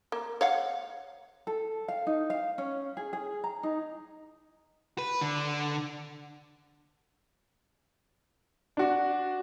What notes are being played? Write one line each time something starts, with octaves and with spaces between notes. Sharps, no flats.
A#3
C#5 F5 F#5
A4
F5
D#4
F5
C#4
G#4
G#4
A#5
D#4
B4
D3
D4 F#4